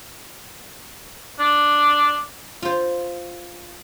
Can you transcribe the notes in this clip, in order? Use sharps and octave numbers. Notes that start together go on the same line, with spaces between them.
D4
F4 C5